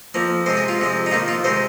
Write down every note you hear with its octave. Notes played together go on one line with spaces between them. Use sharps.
F2 F3 A#3
C3 G#3 C5
G#4
F4
F2 C3 G#3
D#4
F2 D#3 A#3 F4
F4
C3 D#3 G#3 C5